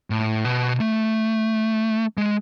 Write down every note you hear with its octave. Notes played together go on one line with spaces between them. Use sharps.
A2
B2
A3
G#3